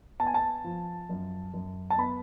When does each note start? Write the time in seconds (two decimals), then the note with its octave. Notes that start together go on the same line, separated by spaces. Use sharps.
0.19 B3 A5
0.27 G#5
0.34 A5
0.64 F3
1.09 F#2
1.54 F#2
1.90 A5
1.98 B3 B5